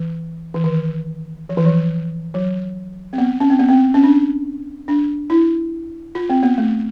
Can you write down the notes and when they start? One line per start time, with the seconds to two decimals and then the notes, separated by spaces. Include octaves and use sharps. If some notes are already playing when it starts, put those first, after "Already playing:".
Already playing: E3
0.54 E3
0.64 D#3
1.49 F3
1.57 E3
1.65 F3
2.34 F#3
3.13 C4
3.18 B3
3.40 C#4
3.50 C4
3.59 B3
3.69 C4
3.94 C#4
4.04 D4
4.88 D4
5.30 E4
6.15 F4
6.30 C4
6.43 B3
6.58 A3